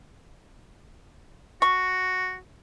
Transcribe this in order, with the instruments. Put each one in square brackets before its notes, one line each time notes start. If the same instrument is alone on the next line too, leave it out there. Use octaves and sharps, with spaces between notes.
[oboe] F#4 [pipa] C#6